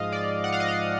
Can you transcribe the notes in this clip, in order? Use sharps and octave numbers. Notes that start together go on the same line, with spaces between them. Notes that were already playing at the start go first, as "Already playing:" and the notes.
Already playing: G#2 F3 G#3 D#5 F5
D5
F#5
F5
D#5
F5